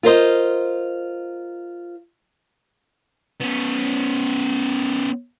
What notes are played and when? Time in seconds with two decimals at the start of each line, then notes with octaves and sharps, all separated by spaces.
0.03 F4 A#4 C5 D#5
3.40 B3 C#4